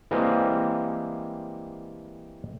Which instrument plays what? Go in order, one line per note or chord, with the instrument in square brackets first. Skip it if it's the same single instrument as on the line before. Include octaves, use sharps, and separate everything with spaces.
[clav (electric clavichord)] E3 G3 G#3 A#3 C4